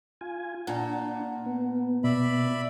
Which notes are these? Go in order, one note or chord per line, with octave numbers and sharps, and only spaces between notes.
F4 G#5
A#2 D4 F#5 A5 A#5
B3
B2 D5 E5 B5